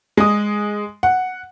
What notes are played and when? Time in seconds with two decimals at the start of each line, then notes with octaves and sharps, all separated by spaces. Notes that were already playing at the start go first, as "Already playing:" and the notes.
0.17 G#3 D#6
1.03 F#5